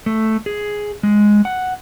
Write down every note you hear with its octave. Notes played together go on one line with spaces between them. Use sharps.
A3
G#4
G#3
F#5